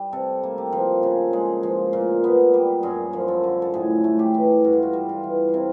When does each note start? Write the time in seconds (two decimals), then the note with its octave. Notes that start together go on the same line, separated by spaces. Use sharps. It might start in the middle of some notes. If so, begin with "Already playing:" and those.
Already playing: G3
0.12 C3 A4
0.43 A#3
0.58 G4
0.73 F3
1.03 C#3
1.33 G#3
1.63 F3
1.93 A#2
2.24 B3
2.54 G3
2.83 F#2 G#4
3.13 F3
3.28 A4
3.44 D3
3.62 A4
3.74 A2 G#4
4.04 A3
4.19 G4
4.34 E3
4.64 G2 F#4
4.73 F4
4.83 F#4
4.93 G3
5.09 F4
5.23 E3
5.48 F4
5.54 C3 E4